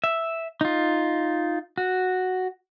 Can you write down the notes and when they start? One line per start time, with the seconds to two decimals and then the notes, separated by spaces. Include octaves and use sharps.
0.04 E5
0.61 D#4 F4
1.77 F#4